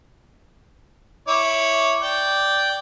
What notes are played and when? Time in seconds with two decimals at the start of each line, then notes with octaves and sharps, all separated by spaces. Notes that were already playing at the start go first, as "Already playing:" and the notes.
1.28 E4 C#5 D6
2.02 D5 G5